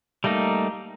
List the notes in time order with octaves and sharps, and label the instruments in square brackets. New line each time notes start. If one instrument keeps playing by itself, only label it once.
[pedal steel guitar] G3 A3 A#3 D#4